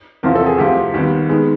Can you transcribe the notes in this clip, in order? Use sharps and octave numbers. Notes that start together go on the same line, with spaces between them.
E2 C3 F3 A#4
A4
G#4
D2 C3 F3 G4
D#2 D#3 G3 B3 F#4
D#3 G#3 B3